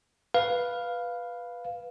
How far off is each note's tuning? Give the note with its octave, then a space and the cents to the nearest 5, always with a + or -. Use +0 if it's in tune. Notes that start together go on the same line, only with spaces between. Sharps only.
B4 -5 F5 +0